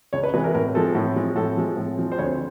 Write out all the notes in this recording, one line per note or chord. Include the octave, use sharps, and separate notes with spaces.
C#2 C#5
B4
C3 E3 G#3 B4
A#4
A2 A#4
F3 G#3 C4 A4
A2
F3 G#3 C4
A2 A4
F3 G#3 C4
A2
F3 G#3 C4
C5
D2 C#5